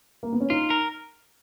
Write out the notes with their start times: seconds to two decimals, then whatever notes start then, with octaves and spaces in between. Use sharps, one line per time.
0.23 A#3
0.32 B3
0.41 C#4
0.50 D#4 F4
0.70 A#4